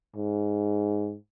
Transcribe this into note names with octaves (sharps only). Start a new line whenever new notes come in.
G#2